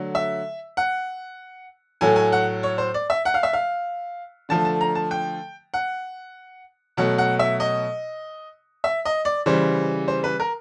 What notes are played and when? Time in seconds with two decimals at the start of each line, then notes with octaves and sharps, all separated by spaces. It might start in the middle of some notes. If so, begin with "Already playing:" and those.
Already playing: D3 F#3 A3
0.15 E5
0.77 F#5
2.01 A2 F#3 A3 G#5
2.16 G#5
2.32 F#5
2.63 C#5
2.78 C5
2.94 D5
3.10 E5
3.25 F#5
3.34 F5
3.43 E5
3.53 F5
4.49 D3 F3 A3 A5
4.65 A5
4.81 A#5
4.95 A5
5.11 G5
5.74 F#5
6.97 B2 F#3 A3 F#5
7.18 F#5
7.39 E5
7.60 D#5
8.84 E5
9.05 D#5
9.25 D5
9.46 C#3 E3 G3 C5
10.08 C5
10.24 B4
10.40 A#4